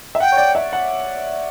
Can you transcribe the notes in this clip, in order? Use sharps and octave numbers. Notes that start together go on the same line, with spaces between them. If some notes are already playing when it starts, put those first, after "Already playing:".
E5
F#5 G5
C#5
D5
E5
F#5